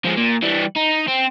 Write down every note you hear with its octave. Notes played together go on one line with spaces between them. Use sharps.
F3 G#3
A#2
E3 G3
D#4
C4